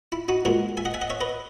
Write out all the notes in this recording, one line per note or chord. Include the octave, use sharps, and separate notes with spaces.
E4
D#4 F#4
A#2 G#3 F#4 A#4
E5 G#5
D#5 F#5
E5 G#5
D#5 F#5
C#5 E5
B4 D#5